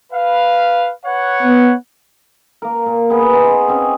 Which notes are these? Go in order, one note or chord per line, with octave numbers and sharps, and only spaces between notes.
B4 F5
B4 C#5 F#5
B3
A#3 A#4
A#2
B3 G#4 B4 G#5
B3 D#4 G#5 C6
D#4
C4 C#4 G#4